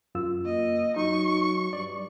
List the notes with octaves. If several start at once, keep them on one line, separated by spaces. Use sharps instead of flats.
F#2 F4 E6
A#3 D#5
F#3 D#4 C#6
G2 D5